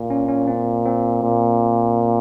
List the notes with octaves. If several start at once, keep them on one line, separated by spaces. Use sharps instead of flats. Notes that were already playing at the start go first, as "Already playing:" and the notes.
Already playing: A#2
C#4
C#4
C4
C4
A#2